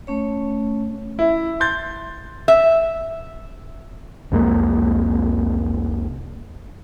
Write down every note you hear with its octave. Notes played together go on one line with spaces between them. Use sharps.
A3 C#4 C#5
E4
C6 G6 A6
E5
C2 F2 G#3 A#3